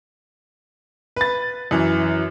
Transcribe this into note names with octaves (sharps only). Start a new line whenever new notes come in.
B4 A6
F#2 E3